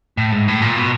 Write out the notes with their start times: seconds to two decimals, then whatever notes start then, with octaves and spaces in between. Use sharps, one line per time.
0.18 A2
0.33 G#2
0.48 A2
0.62 A#2
0.77 B2